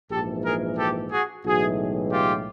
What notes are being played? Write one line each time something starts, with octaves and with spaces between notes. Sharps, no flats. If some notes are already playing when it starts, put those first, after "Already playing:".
A#1 G#2 E3 G4 A4
G#4 A#4
G4 A4
F#4 G#4
B1 A2 E3 G#3 F#4 G#4
F4 G4